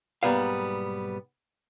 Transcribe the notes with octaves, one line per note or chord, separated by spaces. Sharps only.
B1 G#2 G3 A#3 B3 F5